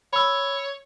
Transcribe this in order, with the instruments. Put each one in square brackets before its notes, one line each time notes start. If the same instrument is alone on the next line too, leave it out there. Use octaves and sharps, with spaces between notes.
[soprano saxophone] C#5 [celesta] B5 E6